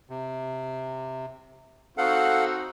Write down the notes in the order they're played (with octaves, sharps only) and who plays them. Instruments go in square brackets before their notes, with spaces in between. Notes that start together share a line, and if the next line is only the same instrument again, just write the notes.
[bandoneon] C3
[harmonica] C4 D#4 F#4 [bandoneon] A4 F5 F#5